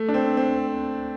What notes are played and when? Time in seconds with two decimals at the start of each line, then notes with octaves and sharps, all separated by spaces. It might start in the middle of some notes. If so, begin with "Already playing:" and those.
Already playing: A3
0.09 D4
0.14 C4
0.37 C4